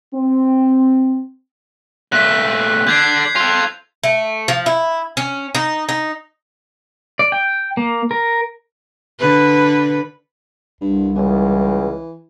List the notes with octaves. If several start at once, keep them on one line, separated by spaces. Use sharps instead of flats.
C4
A#2 A3 F#6 B6
D3 D4 G6 G#6 C7
F4 A4 F7
A3
F3
E4
C#4
D#4
D#4
D5
G5
A#3
A#4
D3 B4
C2 G2
C#2 E3